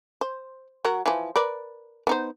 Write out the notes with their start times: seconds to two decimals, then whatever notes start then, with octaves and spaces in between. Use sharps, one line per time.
0.21 C5
0.85 F#3 F#4 A#4
1.06 E3 F3
1.36 A#4 B4 D5
2.07 B3 D#4 C5